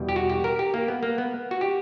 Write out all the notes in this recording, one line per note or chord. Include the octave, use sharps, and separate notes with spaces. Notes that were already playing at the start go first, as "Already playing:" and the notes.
Already playing: E2 B2 G3
G4
F#4
G4
A#4
G4
A#3
B3
A#3
B3
F#4
G4